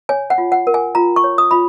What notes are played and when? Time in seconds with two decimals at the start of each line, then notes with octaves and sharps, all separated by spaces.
0.09 C#5 G#5
0.30 F#5
0.38 F4
0.52 F#5
0.67 A#4
0.74 G#5
0.95 F4 A#5
1.16 C#6
1.24 C#5
1.38 D#6
1.51 F4 B5